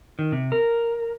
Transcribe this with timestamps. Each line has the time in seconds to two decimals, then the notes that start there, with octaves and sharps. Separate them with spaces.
0.19 D#3
0.32 C3
0.52 A#4